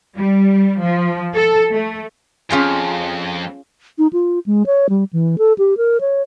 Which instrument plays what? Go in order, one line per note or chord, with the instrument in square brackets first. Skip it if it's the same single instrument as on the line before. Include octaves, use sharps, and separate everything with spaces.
[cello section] G3
F3
A4
A3
[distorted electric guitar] F2 [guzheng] C#4 F4 G#4
[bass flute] D#4
F4
G#3
C#5
G3
E3
A4
G4
A#4
C#5